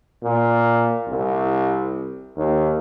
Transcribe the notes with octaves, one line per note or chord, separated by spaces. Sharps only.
A#2
C2
D#2